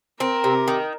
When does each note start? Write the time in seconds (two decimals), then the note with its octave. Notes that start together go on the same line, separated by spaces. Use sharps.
0.20 C4 A#4
0.44 C3
0.68 D#3